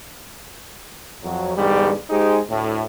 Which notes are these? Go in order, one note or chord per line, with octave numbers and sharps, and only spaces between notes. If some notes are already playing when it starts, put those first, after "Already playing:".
F2 F#3
E2 G#2 D3 G3
G#3 D#4 G4 G#4 C5
D2 A2